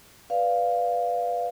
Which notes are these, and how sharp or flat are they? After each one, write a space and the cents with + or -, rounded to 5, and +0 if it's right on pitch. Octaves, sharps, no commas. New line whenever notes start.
B4 +0 D5 +0 F5 +0